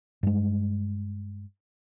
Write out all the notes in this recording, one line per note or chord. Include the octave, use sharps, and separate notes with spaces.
G2 G#3